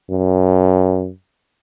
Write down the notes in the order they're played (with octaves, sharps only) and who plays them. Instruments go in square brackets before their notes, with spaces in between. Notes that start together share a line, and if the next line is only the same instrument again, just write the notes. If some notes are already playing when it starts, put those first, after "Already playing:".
[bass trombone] F#2